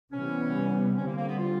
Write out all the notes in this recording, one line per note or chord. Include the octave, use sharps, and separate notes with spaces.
C3 E3 G3 B3 C#4
D3 G3 C4 C#4
A#3
A#3
B3
F4